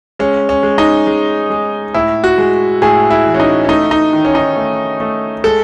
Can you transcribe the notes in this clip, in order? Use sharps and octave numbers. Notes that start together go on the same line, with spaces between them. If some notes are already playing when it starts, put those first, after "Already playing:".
G#3 C#4
C#4
G#3
D#4
G#3
G#3
A2 E4
F#4
G#3
A2 G#4
E4
E3
C#4
D#4
C#4
A3 D#4
D#4
D#3
C#4
D#4
A3
A3
G#3 A4